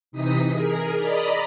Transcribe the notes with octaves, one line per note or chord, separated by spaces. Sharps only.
C3 E3 D#4 D#6 B6
G#4 A#4
D5 D#5 A#5 B5